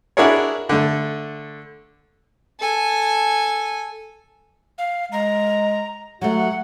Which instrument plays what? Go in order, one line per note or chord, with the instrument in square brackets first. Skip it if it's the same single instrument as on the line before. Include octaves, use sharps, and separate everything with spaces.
[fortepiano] D4 E4 F#4 G#4 A#4 C#5
D3 A3
[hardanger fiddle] A4 G#5
[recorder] F5
[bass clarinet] G#3 [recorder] A#5
[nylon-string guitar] F#3 A3 [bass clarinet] F#4 [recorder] F#5